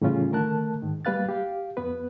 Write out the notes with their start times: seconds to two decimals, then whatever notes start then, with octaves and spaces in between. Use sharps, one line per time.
0.01 A2 C#3 E3 G3 C#4 F4
0.31 D3 D#3 A3 A#4 A5 F#6
0.82 G#2 D#3
1.05 G3 A#3 B4 F5 F#6 A6
1.29 G4 F5
1.77 F2 B3 B4